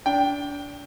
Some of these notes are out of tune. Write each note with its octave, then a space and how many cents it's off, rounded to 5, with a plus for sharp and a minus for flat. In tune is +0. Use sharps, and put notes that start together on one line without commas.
D4 -30 G5 +0